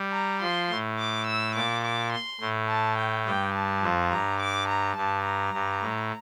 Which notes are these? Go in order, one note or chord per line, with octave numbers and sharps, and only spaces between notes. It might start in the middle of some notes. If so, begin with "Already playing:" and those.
Already playing: G3
A#5
F3 C6
A2
D6
E6
A#2 D6
D6
C6
A2
A5
G5
G2 G5
A5
F2
G2 A#5
D6
A#5
G2 A5
A#5
G2
A2